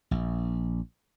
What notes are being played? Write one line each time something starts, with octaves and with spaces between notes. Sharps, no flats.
A#1